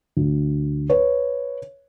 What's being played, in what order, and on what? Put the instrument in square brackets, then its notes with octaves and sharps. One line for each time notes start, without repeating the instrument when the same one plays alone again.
[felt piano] D2
B4 C#5